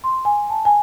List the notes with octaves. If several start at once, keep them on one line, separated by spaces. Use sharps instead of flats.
C6
G#5
A5
G#5